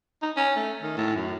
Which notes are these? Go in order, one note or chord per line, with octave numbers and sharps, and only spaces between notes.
D#4
C#4
A3
D#3
A2
F#2